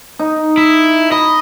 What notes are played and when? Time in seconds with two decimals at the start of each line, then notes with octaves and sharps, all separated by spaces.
0.19 D#4
0.58 E4
1.12 D#5 B5